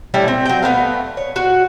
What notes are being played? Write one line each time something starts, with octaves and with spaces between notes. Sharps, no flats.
G3 A3 C#4 E4
C4
F#3 G5
A3 B3 A#4 F5
C#5
F#4